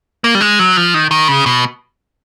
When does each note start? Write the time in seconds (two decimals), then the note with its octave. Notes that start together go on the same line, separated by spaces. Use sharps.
0.24 A#3
0.35 G3
0.41 G#3
0.59 F#3
0.77 F3
0.94 D#3
1.11 D#3
1.28 C#3
1.46 B2